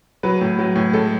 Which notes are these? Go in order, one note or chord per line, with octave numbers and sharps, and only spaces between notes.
F#3 B4
A2
F#3
A2
G#3 A4